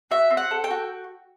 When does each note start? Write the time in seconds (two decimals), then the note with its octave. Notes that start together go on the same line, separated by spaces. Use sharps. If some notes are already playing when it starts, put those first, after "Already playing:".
0.11 F#4 E5
0.30 C4
0.37 F#5
0.51 A4
0.64 G5
0.71 F#4